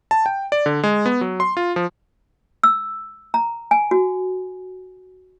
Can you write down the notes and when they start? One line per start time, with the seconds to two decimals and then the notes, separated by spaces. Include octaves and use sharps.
0.11 A5
0.26 G5
0.52 D5
0.66 D3
0.84 G#3
1.06 B3
1.21 F#3
1.40 C6
1.57 F4
1.76 F3
2.63 E6
3.34 A#5
3.71 G#5
3.91 F#4